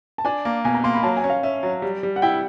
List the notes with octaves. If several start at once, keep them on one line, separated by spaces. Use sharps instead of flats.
A5
D4 G#5
A#3
B2 G#5
A#5
A#3 C6
B5
F#3 A5
G#5
C#4
F5
C#4 E5
F#3
G3
G3
F#5
E4 G5